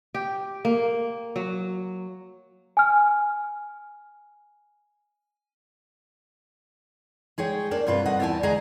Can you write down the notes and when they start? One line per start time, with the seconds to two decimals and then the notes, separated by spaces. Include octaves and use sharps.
0.15 G4
0.65 A#3
1.36 F#3
2.77 G#5 F6
7.38 G#3 G#4 C#5 G5
7.71 A#3 D4 D5
7.87 G2 C3 F4 B4
8.06 A3 D#5 F#5
8.20 E2 E4 G4 D5 G#5 A5
8.43 D2 G#3 G#4 D#5 G#5 A#5